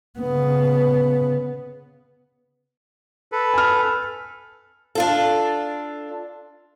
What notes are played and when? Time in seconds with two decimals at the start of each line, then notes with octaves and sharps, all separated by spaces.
0.19 C#3 B3
3.32 A4 B4
3.54 G#5 F6
4.95 D4 F4 A4